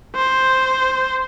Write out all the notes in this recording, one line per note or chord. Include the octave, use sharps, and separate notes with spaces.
C5